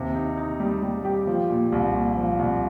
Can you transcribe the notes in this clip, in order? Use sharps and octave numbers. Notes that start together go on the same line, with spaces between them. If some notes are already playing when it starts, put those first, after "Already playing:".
Already playing: D#2 C3
D#4
D#4
G3
G3
G4
F3
A#2
C2
A#2
F3
C2